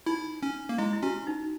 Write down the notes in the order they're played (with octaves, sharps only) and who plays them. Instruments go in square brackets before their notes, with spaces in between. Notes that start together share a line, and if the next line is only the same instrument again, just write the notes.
[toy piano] D#4 [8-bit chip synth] E4
[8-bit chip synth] C#4
A#3
[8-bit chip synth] G#3 [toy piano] E4
[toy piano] E4
[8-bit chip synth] C#4 [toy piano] F#4
[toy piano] D#4